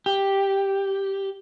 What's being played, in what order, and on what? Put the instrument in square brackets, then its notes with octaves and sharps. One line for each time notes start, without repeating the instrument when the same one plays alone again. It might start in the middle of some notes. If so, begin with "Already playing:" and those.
[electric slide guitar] G4